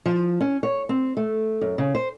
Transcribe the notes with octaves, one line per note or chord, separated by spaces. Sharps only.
F3
C#4
C#5
C4
A3
F#2
C#3
C5